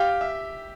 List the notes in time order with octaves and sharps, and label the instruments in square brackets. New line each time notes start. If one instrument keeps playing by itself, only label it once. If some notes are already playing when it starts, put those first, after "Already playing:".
Already playing: [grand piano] G4 G5 [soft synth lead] F5
[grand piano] E5